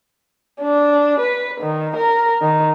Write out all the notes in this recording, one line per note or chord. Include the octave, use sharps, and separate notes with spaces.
D4
B4
D#3
A#4
D#3